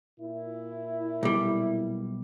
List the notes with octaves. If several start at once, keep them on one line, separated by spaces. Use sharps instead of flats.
A#2 E4
B1 G3